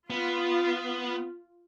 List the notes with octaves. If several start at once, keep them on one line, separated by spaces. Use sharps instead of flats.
B3 F4